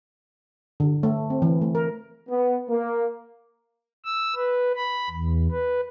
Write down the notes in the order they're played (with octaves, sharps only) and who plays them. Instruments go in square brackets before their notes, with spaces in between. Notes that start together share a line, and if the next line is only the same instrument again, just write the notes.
[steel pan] D3
A3
C4
E3
A3
A#4
[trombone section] B3
A#3
[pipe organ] E6
B4
B5
E2
B4